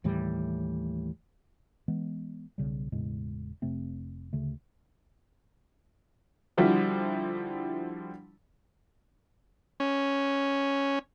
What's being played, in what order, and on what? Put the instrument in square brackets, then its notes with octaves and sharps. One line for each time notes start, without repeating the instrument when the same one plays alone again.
[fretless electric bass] D#2 A2 E3 G3
E3 G#3 B3
B1 C#3 G3
E1 A2 C#3 G#3
F1 C3 A3 C4
D2 C#3 A3
[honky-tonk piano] D3 F3 G3 E4 F#4
[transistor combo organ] C#4